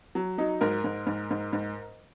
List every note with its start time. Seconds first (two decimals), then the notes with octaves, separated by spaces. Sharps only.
0.15 F#3
0.38 F#3 D#4
0.61 G#2 A#4
0.84 G#2
1.07 G#2
1.31 G#2
1.53 G#2